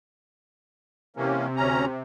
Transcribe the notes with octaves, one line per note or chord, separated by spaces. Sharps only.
C3 E3 A#3 C#4
D2 C#4 A#5